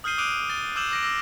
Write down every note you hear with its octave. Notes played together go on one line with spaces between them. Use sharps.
D#6 F6 G6 C7 D#7 G7
D6 D#6 F#6 D7 D#7 F7
A6 D#7 G7
D6 E6 G6 E7 F#7
D6 A#6 D7
D6 E6 A#6